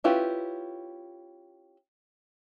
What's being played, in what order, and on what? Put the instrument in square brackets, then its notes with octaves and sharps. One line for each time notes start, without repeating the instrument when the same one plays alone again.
[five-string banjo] C#4 E4 F4 G4 B4